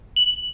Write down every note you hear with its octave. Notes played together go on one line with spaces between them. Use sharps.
F#7